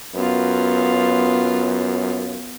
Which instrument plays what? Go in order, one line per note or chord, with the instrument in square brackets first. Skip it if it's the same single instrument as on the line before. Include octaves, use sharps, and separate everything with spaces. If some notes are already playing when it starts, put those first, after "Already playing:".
[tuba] F#2 [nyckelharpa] B3 F4